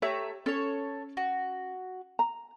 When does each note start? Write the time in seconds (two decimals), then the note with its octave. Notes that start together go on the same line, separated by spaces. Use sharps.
0.02 A3 G4 C#5 E5 A#5
0.46 C#4 A4 C#5
1.17 F#4
2.19 A#5